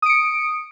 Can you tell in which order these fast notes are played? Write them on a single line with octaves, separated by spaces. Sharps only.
D#6 D7 C#7